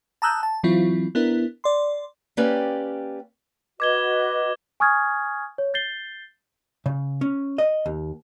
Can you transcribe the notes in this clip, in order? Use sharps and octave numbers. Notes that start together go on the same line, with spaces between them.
A5 A#5 D#6 E6 F#6 G6
A5
E3 F#3 C4 E4 F4
B3 D4 E4 A#4
D5 C6
A#3 C#4 G4 B4 D5 G5
F#4 B4 D#5 D6 G#6 G7
G#5 C#6 D#6 F6 G#6
C#5
G6 A6 C7 G7
C#3
C#4
D#5
D#2